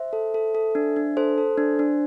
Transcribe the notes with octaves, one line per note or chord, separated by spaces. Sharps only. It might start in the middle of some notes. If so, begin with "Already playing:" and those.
Already playing: C5 E5
A4
A4
A4
D4
D4
A4 C5
A4
D4
D4